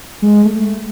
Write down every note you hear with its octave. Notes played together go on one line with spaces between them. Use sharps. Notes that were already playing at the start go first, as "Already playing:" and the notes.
G#3
A3